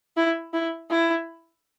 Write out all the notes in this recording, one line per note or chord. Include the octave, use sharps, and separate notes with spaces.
E4
E4
E4